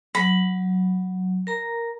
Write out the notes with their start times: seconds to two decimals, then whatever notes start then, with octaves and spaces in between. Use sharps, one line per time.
0.15 F#3 B5
1.47 A#4 A#5